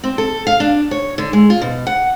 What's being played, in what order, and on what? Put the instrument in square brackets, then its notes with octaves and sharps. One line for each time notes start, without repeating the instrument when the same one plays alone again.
[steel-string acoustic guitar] C4
A4
F5
D4
C#5
D3
G#3
F4
B2
F#5